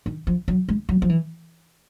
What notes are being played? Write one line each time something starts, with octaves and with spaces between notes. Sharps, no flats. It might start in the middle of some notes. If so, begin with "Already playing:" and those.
D#3
F3
F#3
G#3
F#3
F3
E3